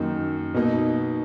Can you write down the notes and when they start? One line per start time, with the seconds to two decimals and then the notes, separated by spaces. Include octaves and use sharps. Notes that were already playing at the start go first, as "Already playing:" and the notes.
Already playing: F#2 D#3 A#3 D#4
0.54 B2 A#3 D#4